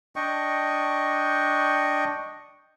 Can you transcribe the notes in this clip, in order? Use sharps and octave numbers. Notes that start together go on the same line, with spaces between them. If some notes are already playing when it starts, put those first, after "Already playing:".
D4 D#5 G5 C#6